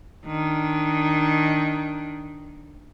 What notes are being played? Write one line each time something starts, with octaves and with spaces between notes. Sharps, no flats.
D#3 D4